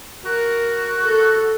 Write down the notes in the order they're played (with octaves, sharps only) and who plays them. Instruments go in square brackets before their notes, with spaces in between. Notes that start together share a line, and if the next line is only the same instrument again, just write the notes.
[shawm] F#4 [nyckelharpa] A#4
[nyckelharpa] A4